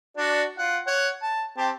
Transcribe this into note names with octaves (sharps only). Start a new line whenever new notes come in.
D4 F#4 D5
F4 F#5
C#5 F#5
A5
C4 G4 A5